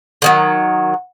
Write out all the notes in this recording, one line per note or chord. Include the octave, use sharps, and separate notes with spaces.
D3 D#3 F#3